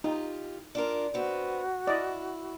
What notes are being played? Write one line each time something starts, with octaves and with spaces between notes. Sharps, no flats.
D#4 F4 G4 D#5
D4 F4 A#4
B3 C4 F#4
E4 D5 D#5